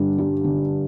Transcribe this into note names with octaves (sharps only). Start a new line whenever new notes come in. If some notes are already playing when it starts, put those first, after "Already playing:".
Already playing: G2 D3 D4
G3
D3